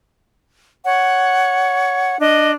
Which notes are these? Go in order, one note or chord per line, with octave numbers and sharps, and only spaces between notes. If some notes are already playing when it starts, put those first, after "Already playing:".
C#5 F#5
D4 D#5